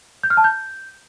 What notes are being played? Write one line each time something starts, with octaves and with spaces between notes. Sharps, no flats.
G6
F6
A5
G6